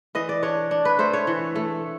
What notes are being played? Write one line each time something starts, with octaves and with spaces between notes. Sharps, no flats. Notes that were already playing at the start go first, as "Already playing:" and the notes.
E3 D#5
D5
D4 C#5
D4
B4
A3 C5
C#5
E3
A3